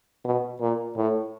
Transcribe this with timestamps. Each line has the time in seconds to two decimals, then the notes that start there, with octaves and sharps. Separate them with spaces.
0.25 B2
0.60 A#2
0.97 A2